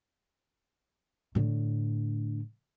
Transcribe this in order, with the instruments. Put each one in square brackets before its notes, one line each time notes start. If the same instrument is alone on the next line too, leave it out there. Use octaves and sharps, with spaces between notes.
[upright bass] A2 D3